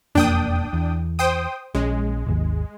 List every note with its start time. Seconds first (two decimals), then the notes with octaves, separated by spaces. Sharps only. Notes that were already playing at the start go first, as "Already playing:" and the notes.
0.15 E1 F2 A#3 D4 G5 D#6
0.73 E2
1.19 C5 G5 D#6
1.75 A#1 G#3 C#4
2.26 D1 G#1 D#2